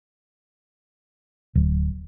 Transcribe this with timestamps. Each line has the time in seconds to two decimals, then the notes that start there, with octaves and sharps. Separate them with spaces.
1.55 D1